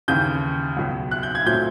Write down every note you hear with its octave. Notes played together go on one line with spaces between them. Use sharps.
D#2 C#3 E3 G6
C#2 B2 F#3
F#6
G6
G#6
A#2 F#3 A3 C4 G6